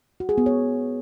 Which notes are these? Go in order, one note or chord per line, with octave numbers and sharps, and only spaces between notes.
F#4
G#4
B3
C#5